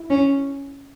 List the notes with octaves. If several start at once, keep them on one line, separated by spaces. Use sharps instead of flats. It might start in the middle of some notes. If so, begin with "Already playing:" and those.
Already playing: E4
C#4